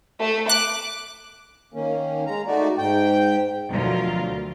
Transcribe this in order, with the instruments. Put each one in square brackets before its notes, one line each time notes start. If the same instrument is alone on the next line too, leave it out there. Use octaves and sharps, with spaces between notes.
[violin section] A3
[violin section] D6 [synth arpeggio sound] F#6
[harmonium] D#3 A#3 C#4
G#3 A#5
A3 D#4 F#4 D5
G#2 G5
[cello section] D2 B2 F3 F#3 F4 A#4